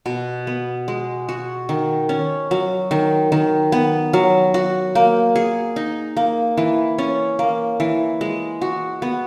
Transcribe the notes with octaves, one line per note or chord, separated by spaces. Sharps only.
B2
B3
G#3
F#4
D#3
C#4
F#3
D#3
D#3
B3
F#3
F#4
A#3
G#4
D#4
A#3
E3
C#4
A#3
E3
G#3
F#4
B3